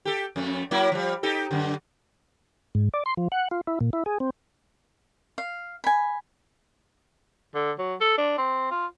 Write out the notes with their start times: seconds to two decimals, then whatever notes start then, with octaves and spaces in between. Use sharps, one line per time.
0.05 G4 A4
0.36 F2 A3
0.71 F#3 A#3 E4
0.92 F3 G3
1.23 D#4 G4 A4
1.51 F#2 D3
2.75 G#2
2.94 D5
3.06 C6
3.17 F3
3.32 F#5
3.51 F4
3.67 E4
3.81 A#2
3.93 E4
4.06 G#4
4.20 C4
5.38 F5
5.84 G#5 B5
7.55 D3
7.78 F#3
8.01 A4
8.18 D4
8.38 C4
8.71 F4